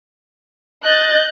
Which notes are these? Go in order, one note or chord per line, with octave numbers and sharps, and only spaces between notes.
D#5 F#6 G6 A6